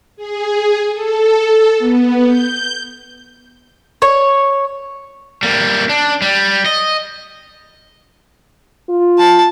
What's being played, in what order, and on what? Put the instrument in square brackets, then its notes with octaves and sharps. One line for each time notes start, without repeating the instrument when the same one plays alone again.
[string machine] G#4
A4
B3
G6
[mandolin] C#5
[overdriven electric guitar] G3 A#3
D4
G3
D#5
[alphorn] F4
[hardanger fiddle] A5